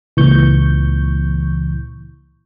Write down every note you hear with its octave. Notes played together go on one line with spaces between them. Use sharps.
C#2 A#2 E3 C#6 G6